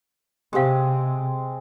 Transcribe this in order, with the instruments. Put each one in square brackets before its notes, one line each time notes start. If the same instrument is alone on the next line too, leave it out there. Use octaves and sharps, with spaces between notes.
[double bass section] C3 [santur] G#3 C4 [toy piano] G4 F5